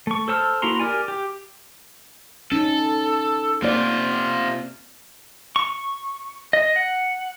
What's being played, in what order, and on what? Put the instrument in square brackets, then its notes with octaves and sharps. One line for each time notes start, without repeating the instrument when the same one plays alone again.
[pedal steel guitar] A3 C#6
A4 C5 A5 E6 F6
A#3 E4 F#4 A#5 C6
G4 A#4 D5 G#5
G4
[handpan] C#4 D#4 [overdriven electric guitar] A4
[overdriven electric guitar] C3 F4 [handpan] A#3 D5
[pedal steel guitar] C#6
D#5
F#5